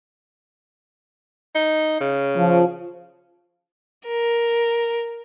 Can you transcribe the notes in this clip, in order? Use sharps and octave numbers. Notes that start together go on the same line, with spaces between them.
D#4
C#3
F3
A#4